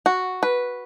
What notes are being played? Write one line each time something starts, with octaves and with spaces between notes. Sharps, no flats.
F#4
B4